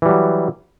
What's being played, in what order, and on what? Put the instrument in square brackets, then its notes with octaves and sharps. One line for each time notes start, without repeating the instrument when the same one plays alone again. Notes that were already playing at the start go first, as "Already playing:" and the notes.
[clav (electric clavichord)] E3
G3
F#3